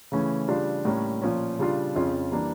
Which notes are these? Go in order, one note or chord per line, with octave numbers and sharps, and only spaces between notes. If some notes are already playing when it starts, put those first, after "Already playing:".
C#3 E3 A3 C#4
C#3 G3 D4 F4
A2 G3 A#3 C#4
A#2 F3 C#4
C#3 G3 D4 F4
F2 C#3 F3 C#4 F4
E3 G3 A#3 D4